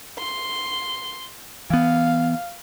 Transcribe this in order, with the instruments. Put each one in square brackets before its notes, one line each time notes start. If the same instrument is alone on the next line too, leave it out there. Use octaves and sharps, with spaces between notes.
[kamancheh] C6
[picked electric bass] E3 B3 [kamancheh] F5